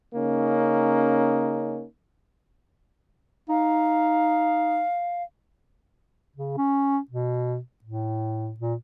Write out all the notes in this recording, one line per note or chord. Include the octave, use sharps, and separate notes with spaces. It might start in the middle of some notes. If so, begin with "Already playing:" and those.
C#3 A#3 C#4 D#4
D#4 F5
C#3
C#4
B2
A2
A#2